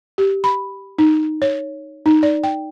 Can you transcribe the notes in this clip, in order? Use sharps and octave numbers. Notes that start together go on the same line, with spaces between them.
G4
B5
D#4
C#5
D#4
D5
G5